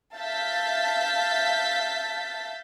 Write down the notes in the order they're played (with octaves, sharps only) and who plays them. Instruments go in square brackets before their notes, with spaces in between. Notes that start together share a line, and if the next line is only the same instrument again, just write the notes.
[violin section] E5 F5 A5 G6 A6 B6